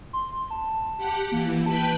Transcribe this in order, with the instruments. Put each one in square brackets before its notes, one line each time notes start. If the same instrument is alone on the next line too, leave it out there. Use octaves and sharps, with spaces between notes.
[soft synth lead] C6
A5
[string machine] G4 F#5
[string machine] E3 [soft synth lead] A#3
[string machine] B4 G5 B5 [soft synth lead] A5